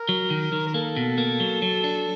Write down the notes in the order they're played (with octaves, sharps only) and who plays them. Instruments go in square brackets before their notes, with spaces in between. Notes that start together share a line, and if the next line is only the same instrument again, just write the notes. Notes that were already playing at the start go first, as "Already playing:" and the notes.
Already playing: [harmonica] A#4
[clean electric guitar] F#3
D#3
D#3
[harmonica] A#4
[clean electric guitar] A#3 [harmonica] A4
[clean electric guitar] B2
A#3
F#3
F#3
D4